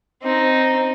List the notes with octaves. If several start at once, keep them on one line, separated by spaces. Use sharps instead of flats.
C4 D#4